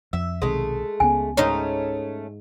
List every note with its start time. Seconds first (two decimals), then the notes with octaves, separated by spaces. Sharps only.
0.13 F2 E5
0.42 B1 C3 D#3 G#3 A3
1.00 C#2 C#3 B3 G#5
1.37 G#2 A3 C#4 D#4 D#5